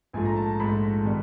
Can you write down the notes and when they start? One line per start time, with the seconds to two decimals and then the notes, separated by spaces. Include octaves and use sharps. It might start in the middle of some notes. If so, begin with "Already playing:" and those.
0.13 A#1 G#2 F3 A3 G#5
0.25 A#5
0.36 A5
0.48 A#5
0.60 A#1 G#2 F3 A3 B5
1.05 D#3 G3 B3